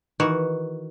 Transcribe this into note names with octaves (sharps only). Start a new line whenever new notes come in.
D#3 E3 F#4